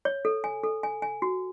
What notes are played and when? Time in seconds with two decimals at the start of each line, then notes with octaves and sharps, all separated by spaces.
0.05 C#5
0.25 A4
0.44 G#5
0.64 A4
0.83 G#5
1.02 G#5
1.22 F#4